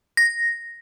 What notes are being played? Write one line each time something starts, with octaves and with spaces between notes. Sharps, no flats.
A#6